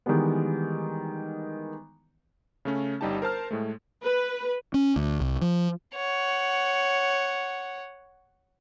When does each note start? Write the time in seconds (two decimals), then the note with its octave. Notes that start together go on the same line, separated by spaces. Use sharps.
0.06 D#3 E3 G3 G#3 B3
2.65 C#3 A3 C#4
3.01 G1 G3 D#4 G4 A5
3.22 A#4 C5 A5 F6
3.51 A2 G#3 A3
4.02 B4
4.74 C#4
4.96 D2
5.20 C2
5.42 F3
5.96 C#5 F#5